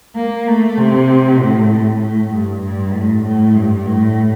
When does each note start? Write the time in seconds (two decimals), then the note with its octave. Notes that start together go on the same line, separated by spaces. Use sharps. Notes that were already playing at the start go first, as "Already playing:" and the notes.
0.16 A#3
0.47 A3
0.77 C3
1.39 A2
1.70 A2
2.01 A2
2.31 G2
2.63 G2
2.93 A2
3.25 A2
3.55 G2
3.86 A2